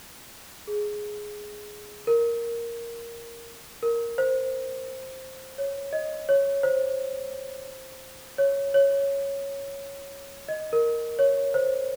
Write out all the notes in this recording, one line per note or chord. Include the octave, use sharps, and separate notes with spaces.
G#4
A#4
A#4
C5
C#5
D#5
C#5
C5
C#5
C#5
D#5
A#4
C#5
C5